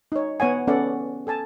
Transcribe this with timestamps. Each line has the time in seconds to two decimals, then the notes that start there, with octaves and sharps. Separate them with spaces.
0.12 D#4 C#5
0.40 B3 C#5 F#5 G#5
0.67 B3 C#4 A4 D5 F#5
1.27 A4 G#5 A5